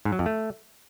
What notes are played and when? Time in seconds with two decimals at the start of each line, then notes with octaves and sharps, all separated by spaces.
0.05 G#2
0.12 F#3
0.19 F2
0.26 A3